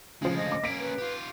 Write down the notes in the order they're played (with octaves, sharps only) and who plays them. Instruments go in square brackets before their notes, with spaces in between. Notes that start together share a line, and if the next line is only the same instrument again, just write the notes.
[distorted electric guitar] D2 G#3 [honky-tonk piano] C#3 F3
[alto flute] D#5
[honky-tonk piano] D6
[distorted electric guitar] A#3 C#4 [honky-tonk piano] B6 D7
[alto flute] B4
[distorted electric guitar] F4 G4